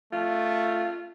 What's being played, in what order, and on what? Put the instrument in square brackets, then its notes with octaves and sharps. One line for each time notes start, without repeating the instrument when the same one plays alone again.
[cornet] A3 [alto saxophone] F4